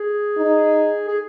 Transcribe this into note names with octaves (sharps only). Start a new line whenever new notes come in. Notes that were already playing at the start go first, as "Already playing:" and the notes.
Already playing: G#4
D#4
G#4